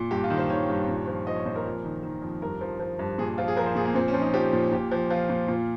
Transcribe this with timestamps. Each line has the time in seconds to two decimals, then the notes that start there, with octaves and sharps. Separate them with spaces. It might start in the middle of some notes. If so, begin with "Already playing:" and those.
Already playing: A#2
0.11 G2 G4
0.24 F4
0.30 D#3
0.38 C5
0.50 D#3 C#5
0.70 G2
0.88 A#2
1.07 F3
1.27 F3 D#5
1.36 C#5
1.46 A#2 C5
1.56 A#4
1.65 F2
1.85 D#3
2.03 D#3
2.22 F2
2.42 G2 A#4
2.61 F3
2.80 F3
2.99 G2
3.18 A#2 G#4
3.38 F3 F4
3.48 G#4
3.57 F3 A#4
3.66 C5
3.75 A#2 G#4
3.85 A#3
3.95 A#2 C4
4.08 C#4
4.14 F3
4.21 D#4
4.34 F3 G4
4.53 A#2
4.72 A#2 G4
4.91 F3
5.10 F3 F4
5.30 A#2
5.48 A#2